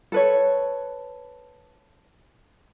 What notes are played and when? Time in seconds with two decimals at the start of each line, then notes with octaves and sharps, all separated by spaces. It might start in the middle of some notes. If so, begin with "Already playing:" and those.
0.12 A4 B4 C#5